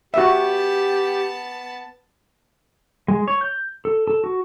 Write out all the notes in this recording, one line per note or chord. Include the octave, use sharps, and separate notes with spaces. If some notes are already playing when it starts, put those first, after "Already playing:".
B3 F#4 G4 E5 A5
G#3
C#5
G6
A4
A4
F#4